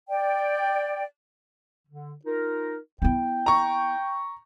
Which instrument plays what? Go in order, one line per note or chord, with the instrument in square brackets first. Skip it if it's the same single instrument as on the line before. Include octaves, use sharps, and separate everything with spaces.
[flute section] D5 G5
[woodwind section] D3
D#4 F4 A#4
[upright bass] B3 E4 [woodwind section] G5
[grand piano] A#5 C#6